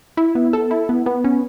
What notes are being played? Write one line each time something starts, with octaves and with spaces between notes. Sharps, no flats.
E4
B3
A4
E4
B3
B3
C#4